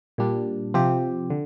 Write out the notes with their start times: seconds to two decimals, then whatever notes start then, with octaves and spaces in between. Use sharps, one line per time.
0.18 A#2 G3 D4
0.74 C3 F3 C4 G4
1.30 D3